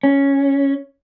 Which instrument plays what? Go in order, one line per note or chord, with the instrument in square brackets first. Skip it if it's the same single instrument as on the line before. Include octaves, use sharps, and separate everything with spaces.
[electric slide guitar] C#4